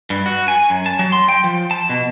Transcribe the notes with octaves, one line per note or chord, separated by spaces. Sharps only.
G2
F#4
G#5
F#2
A5
F#3
C6
G5
F3
A5
B2